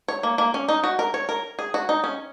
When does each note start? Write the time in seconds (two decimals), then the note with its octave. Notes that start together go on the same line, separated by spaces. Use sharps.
0.08 C#5
0.23 A#3
0.38 A#3
0.54 C#4
0.69 D#4
0.84 F#4
0.99 A#4
1.14 C#5
1.29 A#4
1.59 G#4
1.74 F#4
1.89 D#4
2.04 C#4